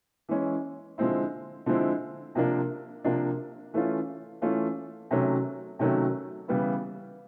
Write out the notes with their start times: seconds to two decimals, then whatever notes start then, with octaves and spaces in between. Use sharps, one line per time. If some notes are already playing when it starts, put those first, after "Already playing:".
0.29 E3 G#3 C#4 E4
0.98 D3 F3 G#3 C4 E4
1.66 D3 F3 G#3 C4 E4
2.35 C3 F3 A#3 D4
3.04 C3 F3 A#3 D4
3.74 E3 A3 C#4 F4
4.42 E3 A3 C#4 F4
5.11 C3 D#3 F#3 A3 C#4
5.79 C3 D#3 F#3 A3 C#4
6.48 C#3 E3 G3 B3 E4